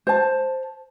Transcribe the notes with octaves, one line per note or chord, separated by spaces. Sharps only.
C5 A5